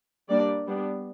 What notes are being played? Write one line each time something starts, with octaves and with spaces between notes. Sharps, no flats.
G3 A#3 D4 D5
G3 B3 D4